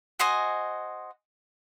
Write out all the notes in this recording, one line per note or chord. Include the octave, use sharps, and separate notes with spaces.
F#4 C5 D#5 G#5